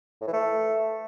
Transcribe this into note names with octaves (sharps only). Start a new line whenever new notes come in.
A2
E3
A3